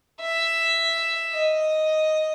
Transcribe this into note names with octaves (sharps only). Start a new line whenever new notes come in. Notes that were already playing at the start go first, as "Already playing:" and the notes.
E5
D#5